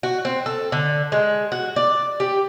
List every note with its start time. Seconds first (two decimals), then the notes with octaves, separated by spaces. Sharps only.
0.03 F#4
0.25 C4
0.46 A4
0.72 D3
1.12 G#3
1.52 F#4
1.76 D5
2.20 G4